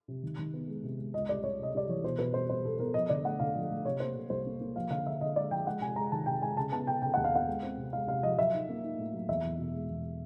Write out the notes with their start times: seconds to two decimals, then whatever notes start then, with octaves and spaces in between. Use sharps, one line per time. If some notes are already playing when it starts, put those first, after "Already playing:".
0.08 C3
0.23 D#3
0.39 D#3
0.54 B3
0.68 G#3
0.83 C3
0.99 G#3
1.14 C#2 D#5
1.29 G3 D5
1.43 G3 C#5
1.59 C3 D#5
1.74 G3 D5
1.89 E3 C#5
2.04 B2 C5
2.19 B2 B4
2.34 G3 C5
2.49 G3 C5
2.65 B3 A4
2.79 B3 A#4
2.94 F3 D#5
3.09 D3 D5
3.25 A3 F#5
3.40 D3 F5
3.55 F3
3.71 A3
3.85 C3 C#5
4.00 A#3 C5
4.16 C3
4.30 C2 C5
4.45 A#3
4.60 A#3
4.76 F3 F5
4.90 D3 F5
5.06 D3 E5
5.20 D3 D#5
5.36 G#3 D5
5.51 F3 G5
5.67 G#3 F#5
5.81 C3 G#5
5.96 G#3 A#5
6.12 D#3 A5
6.26 C3 G5
6.41 G#3 G#5
6.57 C#3 A5
6.72 B3 A5
6.86 C#3 G5
7.02 C#3 G5
7.14 D#2 F#5
7.24 F5
7.32 B3 F#5
7.48 G#3
7.63 C4
7.77 C3
7.93 G#3 F5
8.07 C3 F5
8.23 F3 D#5
8.38 F#3 E5
8.53 D#4
8.69 A#3
8.83 D#4
8.98 A2
9.13 F#3
9.29 E2 E5
9.44 E2
9.58 B2
9.74 G#3
9.89 E2